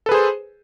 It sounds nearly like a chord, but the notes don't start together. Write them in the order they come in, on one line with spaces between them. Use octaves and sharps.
A4 B4 G#4 C5